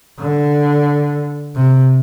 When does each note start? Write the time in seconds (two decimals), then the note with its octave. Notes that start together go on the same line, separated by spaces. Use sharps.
0.20 D3
1.55 C3